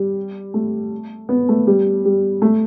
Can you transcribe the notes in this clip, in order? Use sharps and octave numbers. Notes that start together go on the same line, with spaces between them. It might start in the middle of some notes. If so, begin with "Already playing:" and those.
Already playing: G3
A3
B3
A3
G3
G3
A3